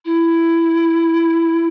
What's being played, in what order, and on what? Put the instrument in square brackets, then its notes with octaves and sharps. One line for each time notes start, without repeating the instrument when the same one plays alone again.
[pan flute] E4